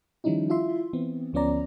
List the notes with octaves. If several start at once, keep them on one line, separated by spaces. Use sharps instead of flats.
D#3 F3 G3 C#4 D#4 E4
E4 F4 E5 C6
E3 B3 C4
D2 F3 B3 C#4 D5 A#5